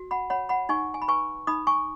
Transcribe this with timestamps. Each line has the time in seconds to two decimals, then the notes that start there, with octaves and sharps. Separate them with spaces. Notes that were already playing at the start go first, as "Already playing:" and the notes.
Already playing: F#4
0.11 F#5 B5
0.30 C#5 F#5 B5
0.49 F#5 B5
0.69 D#4 G#5 C#6
0.94 G#5
1.02 B5
1.08 B4 G#5 C#6
1.47 D#4 B5 D#6
1.67 G#5 C#6